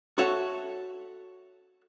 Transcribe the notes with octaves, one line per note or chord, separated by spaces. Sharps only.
F#4 A4 C#5 E5 F#5